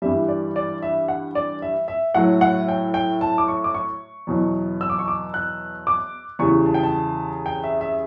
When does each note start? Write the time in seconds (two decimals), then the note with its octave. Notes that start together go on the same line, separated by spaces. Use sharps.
0.02 G2 E3 G3 E5
0.28 D5
0.56 D5
0.82 E5
1.08 F#5
1.35 D5
1.62 E5
1.88 E5
2.14 A2 F#3 A3 F#5
2.41 F#5
2.68 G5
2.94 G5
3.21 A5
3.38 D6
3.48 C#6
3.64 D6
3.74 C#6
4.27 E2 B2 F#3
4.81 E6
4.90 D6
4.99 C#6
5.08 D6
5.34 F#6
5.87 D6
6.39 E2 C#3 G3 C#6
6.66 A5
6.74 G5
6.83 A5
7.46 G5
7.64 E5
7.81 E5